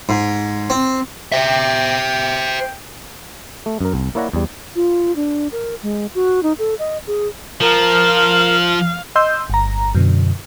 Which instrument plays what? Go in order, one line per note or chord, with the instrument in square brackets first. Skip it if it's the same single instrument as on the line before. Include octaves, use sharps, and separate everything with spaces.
[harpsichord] G#2
C4
[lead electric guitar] C5 E5 [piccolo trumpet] G5
[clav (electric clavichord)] A3
F#2 A#4
C2
A#3 E4 C#5 D5 F#5 A#5
E2 G3
[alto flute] F4
D4
A#4
G#3
F#4
D#4
A4
D#5
G#4
[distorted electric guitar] F3 [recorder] A#4 [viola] F5
[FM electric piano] D#5 C6 E6 G6
G1 A#5
F#2 B2 D3